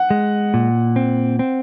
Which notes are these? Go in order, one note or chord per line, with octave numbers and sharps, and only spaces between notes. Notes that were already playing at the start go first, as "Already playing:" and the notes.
Already playing: F#5
G#3
A#2
C4
C4